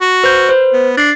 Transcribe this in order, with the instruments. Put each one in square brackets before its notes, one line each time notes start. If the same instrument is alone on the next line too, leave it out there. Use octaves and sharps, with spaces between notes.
[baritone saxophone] F#4
[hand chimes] B4 C5 G6
B4 C5
[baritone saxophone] B3
[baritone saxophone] D4 [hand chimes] A6 C7